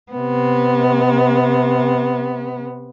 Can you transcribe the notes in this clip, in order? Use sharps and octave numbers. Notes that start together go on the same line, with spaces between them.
C3 B3